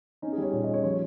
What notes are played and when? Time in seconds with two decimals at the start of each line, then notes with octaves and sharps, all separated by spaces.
0.22 C#4 D#4
0.33 G#4
0.38 G3 C#5
0.53 A#2 C#5
0.64 D#5
0.69 C#4 C#5
0.84 F3 C#5